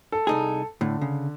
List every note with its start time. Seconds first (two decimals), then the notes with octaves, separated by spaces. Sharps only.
0.12 A4
0.27 C2 D#4 G#4
0.81 A2 D3
1.01 C#3